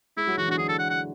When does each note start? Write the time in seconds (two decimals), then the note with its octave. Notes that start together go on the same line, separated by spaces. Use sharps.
0.17 G#3 E4
0.27 F#3
0.38 E3 F#4
0.48 D3
0.51 F#4
0.58 D3 G#4
0.69 A4
0.79 F#5
0.90 F#5